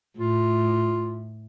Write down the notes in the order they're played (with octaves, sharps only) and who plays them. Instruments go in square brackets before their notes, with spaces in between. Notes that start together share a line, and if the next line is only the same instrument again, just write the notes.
[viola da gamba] A2 [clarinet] F4